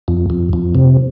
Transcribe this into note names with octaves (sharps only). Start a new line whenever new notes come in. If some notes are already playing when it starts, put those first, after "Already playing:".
F2
F2
F2
C3